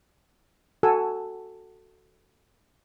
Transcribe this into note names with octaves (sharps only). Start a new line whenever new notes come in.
F#4 A4 G#5 E6